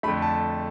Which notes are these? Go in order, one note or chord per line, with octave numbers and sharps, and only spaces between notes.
F2 D3 A3 B5
A5